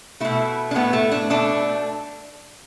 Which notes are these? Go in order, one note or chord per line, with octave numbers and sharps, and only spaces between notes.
B2 A3 E4
D4
A2 A3 B3
A3
D4
B2 A3 D4